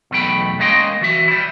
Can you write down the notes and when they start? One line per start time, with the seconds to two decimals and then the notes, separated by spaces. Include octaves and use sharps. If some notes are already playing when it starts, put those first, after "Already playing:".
0.11 B1 E2 A3 B3 G5 B5
0.59 G#3 A#3 C#4 D#5 G5 C6
1.01 E3 F#4 E5
1.28 G3 E4